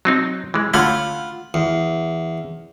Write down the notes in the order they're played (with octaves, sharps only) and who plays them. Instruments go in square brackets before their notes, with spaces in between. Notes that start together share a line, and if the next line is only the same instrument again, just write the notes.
[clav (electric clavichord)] F#3 C4 D#4
E3 G#3
[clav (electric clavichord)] D3 A3 C#4 [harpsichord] F4 F#5 B5
[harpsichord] E2